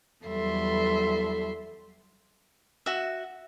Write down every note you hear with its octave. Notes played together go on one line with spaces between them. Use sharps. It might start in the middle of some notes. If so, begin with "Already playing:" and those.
E2 F#3 G3 A4 E5 C6
F#4 E5